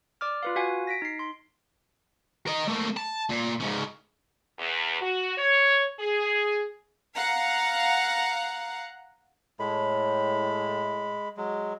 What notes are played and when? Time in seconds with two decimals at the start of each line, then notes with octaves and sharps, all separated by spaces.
0.21 D5 D6 F6
0.43 F4 B4 F5
0.56 F#4 F5 F#5 G#5
0.87 A#6 B6 D7
1.02 D#4 C7
1.19 C6
2.48 A#4 D#5
2.68 A3 A#3
2.97 A5
3.29 A#2
3.60 G#2 C#3
4.59 E2
5.02 F#4
5.38 C#5
6.00 G#4
7.15 F5 F#5 A#5
9.60 A2 G#3 B5
11.37 F#3 G#3